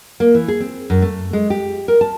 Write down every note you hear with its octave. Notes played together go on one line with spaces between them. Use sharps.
A#3
E3
G#4
C4
F#2
A3
G#3
G4
A#4
A5